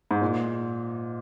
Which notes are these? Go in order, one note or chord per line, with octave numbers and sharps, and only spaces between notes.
G#2
A#2